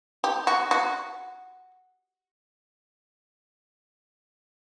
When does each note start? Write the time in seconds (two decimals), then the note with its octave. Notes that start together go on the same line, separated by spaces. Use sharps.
0.24 G4
0.47 F#4
0.71 F#4